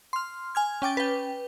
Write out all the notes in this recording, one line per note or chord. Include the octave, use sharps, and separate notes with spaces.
C6 F6
G#5 F6 G#6
C#4 G5 D6 A6
B4 G5